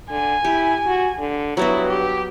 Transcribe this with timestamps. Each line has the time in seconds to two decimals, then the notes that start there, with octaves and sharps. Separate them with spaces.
0.10 D3 G#5
0.45 E4 G4
0.86 F#4
1.19 D3
1.57 G2 F#3 B3 E4 F#4
1.88 G4